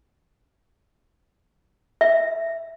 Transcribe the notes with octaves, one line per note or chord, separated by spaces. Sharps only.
E5